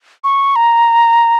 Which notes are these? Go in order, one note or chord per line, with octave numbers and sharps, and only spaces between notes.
C#6
A#5